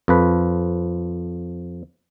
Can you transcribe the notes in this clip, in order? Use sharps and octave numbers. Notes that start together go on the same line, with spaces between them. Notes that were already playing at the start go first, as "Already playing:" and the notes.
F2 F3 B4